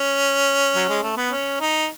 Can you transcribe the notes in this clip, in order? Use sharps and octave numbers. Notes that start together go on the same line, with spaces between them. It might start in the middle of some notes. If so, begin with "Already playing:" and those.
Already playing: C#4
F#3
G#3
A3
B3
C#4
D#4